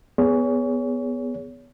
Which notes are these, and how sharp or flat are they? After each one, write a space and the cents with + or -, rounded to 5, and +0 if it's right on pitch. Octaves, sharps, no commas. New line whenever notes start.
B3 +0 G#4 -5 C#5 +30